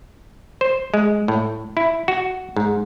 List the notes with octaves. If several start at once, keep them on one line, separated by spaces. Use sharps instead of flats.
C5
G#3
A2
E4
F#4
G#2